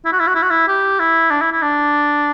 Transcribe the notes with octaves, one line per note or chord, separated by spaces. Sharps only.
E4
F#4
E4
F#4
E4
F#4
E4
G4
E4
D4
E4
E4
D4